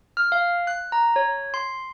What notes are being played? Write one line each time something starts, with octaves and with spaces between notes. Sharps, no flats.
F6
F5
F#6
A#5
C#5
C6